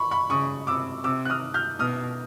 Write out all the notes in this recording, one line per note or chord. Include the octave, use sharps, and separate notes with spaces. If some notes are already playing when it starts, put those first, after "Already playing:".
Already playing: B5 C#6
B5 C#6
C#3 C#6 D#6
C3 D6 E6
C3 D6 E6
F#6
D#6 F6
F6 G6
B2 D#6 F6